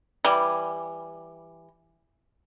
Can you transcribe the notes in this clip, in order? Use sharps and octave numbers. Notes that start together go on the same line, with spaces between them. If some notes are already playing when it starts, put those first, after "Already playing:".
E3 G3